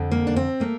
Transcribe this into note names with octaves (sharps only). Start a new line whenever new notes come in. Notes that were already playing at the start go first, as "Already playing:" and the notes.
Already playing: F2 D3
A#3
D4
C4
A3 A#3